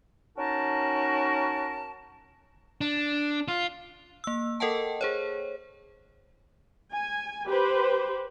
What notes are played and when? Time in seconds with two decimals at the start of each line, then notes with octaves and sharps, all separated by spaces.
0.37 C#4 D#4 F#4 A#4 A5
2.81 D4
3.48 F4
4.24 A#3 E6
4.60 A4 A#4 D#5 F#5 G5 A5
5.01 G#4 C5 C#5
6.92 G#5
7.47 G4 B4 C5